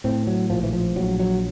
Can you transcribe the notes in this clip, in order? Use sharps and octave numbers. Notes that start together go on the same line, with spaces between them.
A2 C4
F#3
A#1 F3
E3
F3
A#1 F#3
F#3